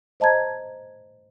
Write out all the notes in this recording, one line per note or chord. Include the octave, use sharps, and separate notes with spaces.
C5 D#5 A5 A#5 G#6